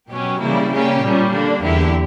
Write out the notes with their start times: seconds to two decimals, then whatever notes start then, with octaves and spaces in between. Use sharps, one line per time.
0.10 B2 F#3 C#4 G4
0.41 C#3 E3 G3 A#3 E4
0.72 C#3 G3 A#3 C#4 G4
1.02 A#2 G3 C#4
1.32 D3 A#3 D4
1.63 E2 D3 A#3 E4 G4